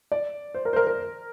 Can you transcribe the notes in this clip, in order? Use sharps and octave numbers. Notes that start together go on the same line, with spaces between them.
D5
C5
A#4
C5
A#4
A#4